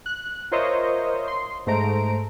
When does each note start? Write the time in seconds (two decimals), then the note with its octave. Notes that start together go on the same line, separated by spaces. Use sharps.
0.06 F#6
0.52 F4 A#4 C5 C#5 D#5 E5
1.28 C6
1.67 G#2 A3 C5 A#5 D7